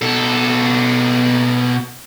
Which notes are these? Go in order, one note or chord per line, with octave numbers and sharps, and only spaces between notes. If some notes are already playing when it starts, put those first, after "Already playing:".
B2 A4